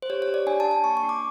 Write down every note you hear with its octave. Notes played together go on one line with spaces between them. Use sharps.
C5
G4 C#5
C#5
G4
D5
D4 G#5
A5
D4
A5
A#3 C#6
C#6
D4
D6